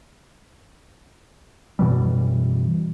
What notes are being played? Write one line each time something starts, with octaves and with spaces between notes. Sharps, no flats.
F#2 B2 E3 G3